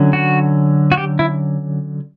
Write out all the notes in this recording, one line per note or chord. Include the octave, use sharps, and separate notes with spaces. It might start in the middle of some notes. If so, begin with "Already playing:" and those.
Already playing: D3 F#3 C#4
F#4
F#4
G4
E4